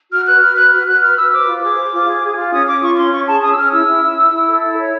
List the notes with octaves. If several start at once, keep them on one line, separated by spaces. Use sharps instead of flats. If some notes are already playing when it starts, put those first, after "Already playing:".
F#4 F6
B4 F#6
B4 F6
B4 F#6
F#4 F6
F#4 F#6
B4 F6
B4 E6
C5 D6
F4
G#4 D6
C5
F4
G#4
G#4
F4
C#4 D#6
C#4 D6
F4 C#6
C#4 C6
C#4 C#6
G#4 A5
C#4 D#6
E6
C#4 F6
E4 E6
E4
E4
E4
E4
A4
E4
C#5